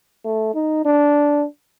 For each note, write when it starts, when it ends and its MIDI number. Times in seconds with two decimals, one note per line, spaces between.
0.25 0.51 57
0.54 0.81 63
0.85 1.45 62